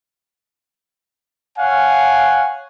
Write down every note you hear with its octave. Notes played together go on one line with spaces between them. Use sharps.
C#5 F5 F#5 G#5